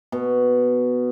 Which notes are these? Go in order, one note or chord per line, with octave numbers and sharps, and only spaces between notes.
B2